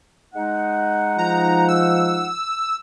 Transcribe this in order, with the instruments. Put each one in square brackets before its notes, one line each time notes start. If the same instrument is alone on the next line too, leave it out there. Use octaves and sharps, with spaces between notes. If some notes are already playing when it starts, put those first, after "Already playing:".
[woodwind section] G#3 D#4 F#5
[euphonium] F3 [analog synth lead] A#5
[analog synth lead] E6